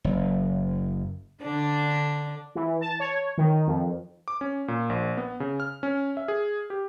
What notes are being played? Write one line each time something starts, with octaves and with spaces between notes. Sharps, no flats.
F#1
D3 D4
E3
A5
C#5
D#3
F2
D6
C#4
A#2
A#1
B3
C#3
F6
C#4
E5
G#4
G4